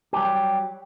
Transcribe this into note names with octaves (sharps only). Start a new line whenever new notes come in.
F#3 G3 G4